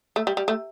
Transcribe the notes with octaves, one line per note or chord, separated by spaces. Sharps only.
A3
G3
G3
A3